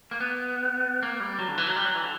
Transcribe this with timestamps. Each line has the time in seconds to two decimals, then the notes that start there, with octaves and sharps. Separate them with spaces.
0.11 A#3
0.20 B3
1.03 A#3
1.20 G3
1.39 F#3
1.48 D3
1.58 E3
1.67 F#3
1.76 G3
1.85 F#3
1.94 E3
2.03 D3